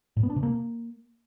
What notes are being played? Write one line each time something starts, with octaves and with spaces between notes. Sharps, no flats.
A2
B3
D4
C3
A#3